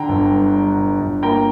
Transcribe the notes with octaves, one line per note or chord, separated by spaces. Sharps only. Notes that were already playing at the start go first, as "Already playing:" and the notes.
Already playing: D3 G5 A#5
G1
G2
G3
D3
G1
A#3 G5 A#5